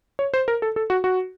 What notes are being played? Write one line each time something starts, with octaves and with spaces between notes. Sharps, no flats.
C#5
C5
A#4
A4
A4
F#4
F#4